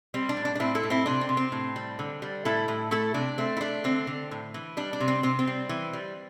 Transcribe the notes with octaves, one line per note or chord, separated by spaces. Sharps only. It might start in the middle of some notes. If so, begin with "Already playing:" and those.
G3 C4
D4
A2
D4
D4
A2 C4 E4
E4 A4
A2
C4 E4
C3 D4
C4
C3
C4
A2
G3
D3
G3
A2 E4 A4
A2
A3 E4 A4
C3 D4
A3 C4
E4
A3 D4
D3 C4
D3
A2
E3
G3 D4
D4
C3
C4
C3 C4
C4
G3
E3
G3